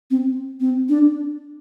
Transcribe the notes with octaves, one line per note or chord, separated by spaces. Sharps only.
C4
C4
D4